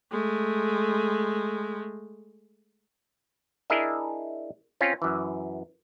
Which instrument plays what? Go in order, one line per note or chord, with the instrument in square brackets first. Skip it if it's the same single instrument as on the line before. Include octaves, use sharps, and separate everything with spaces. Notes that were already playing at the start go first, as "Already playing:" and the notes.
[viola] G#3 A3
[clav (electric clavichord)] D4 E4 G#4 A#4 D#5 E5
C4 C#4 F4
F#2 E3